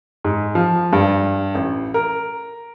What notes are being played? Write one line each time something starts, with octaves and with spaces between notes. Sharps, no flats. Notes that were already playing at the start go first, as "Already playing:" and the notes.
G#2
F3
G2
A1
A#4